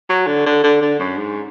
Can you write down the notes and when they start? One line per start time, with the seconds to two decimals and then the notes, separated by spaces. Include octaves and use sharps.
0.10 F#3
0.27 D3
0.46 D3
0.64 D3
0.81 D3
1.00 F#2
1.17 G#2